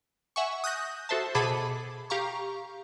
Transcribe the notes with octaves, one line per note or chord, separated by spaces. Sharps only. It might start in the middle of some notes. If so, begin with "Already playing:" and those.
E5 F#5 G#5 C#6
D#6 F#6 G6 A#6
F#4 A4 C5 E5 A5
B2 G#4 A4 A5 B5 D6
G4 F5 A#5 C#6